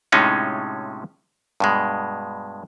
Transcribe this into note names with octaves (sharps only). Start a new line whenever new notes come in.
A2 C3 G#3 C#4 D#4 F4
G2 B2 G#3